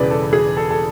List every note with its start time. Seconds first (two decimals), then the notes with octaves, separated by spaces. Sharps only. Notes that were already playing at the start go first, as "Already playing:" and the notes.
Already playing: E1 E2 C#3 E3 B4 D5
0.11 A4
0.33 G#4
0.57 A4
0.71 A4